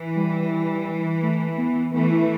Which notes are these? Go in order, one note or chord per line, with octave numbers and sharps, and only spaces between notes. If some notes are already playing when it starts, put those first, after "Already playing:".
Already playing: E3
G3
A3
B3
E3 A3 B3
E4